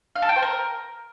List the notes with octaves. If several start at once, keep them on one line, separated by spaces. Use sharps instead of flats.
F5
A4
G5
C5
A#4